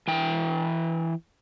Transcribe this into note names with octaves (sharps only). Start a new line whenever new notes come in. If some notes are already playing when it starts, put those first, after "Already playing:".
E3 G5